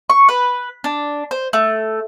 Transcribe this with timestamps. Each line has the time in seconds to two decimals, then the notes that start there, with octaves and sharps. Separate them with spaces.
0.10 C#6
0.29 B4
0.84 D4
1.31 C5
1.53 A3